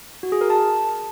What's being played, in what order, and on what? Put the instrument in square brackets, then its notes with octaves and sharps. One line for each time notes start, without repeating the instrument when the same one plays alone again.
[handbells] F#4
G#4
A#4
A5